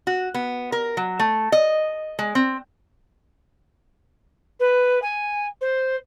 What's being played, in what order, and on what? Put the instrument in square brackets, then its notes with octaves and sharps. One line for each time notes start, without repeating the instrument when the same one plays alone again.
[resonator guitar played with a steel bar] F#4
B3
A#4
F#3
A3
D#5
G#3
C4
[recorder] B4
G#5
C5